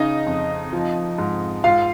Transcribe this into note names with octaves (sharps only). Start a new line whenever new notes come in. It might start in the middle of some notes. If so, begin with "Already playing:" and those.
Already playing: C#3 D#4 D#5
F2
F3
G#2
G#2 F4 F5